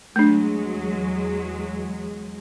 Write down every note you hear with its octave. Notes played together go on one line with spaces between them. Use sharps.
E2 F#3 G#3 A3 D4